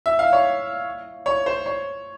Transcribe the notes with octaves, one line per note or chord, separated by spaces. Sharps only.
E5
F5
C#5
C#5
C5
C#5